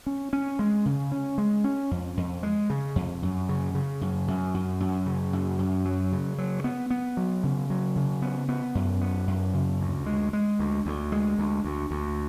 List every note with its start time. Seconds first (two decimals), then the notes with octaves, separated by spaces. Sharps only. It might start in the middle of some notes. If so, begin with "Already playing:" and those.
0.06 C#4
0.33 C#4
0.59 G#3
0.86 C#3
1.12 C#4
1.38 G#3
1.64 C#4
1.91 F2
2.17 F2
2.43 G#3
2.70 C#3
2.96 F2
3.22 F#2
3.49 C#3
3.75 C#3
4.01 F#2
4.28 F#2
4.54 F#2
4.80 F#2
5.06 C#3
5.33 F#2
5.59 F#2
5.85 F#3
6.12 C#3
6.38 F#3
6.64 B3
6.90 B3
7.17 F#3
7.43 C#3
7.70 F#3
7.96 C#3
8.22 B3
8.49 B3
8.75 F#2
9.01 B3
9.27 F#2
9.54 C#3
9.80 D2
10.06 G#3
10.33 G#3
10.59 D2
10.86 D2
11.12 G#3
11.38 D2
11.64 D2
11.91 D2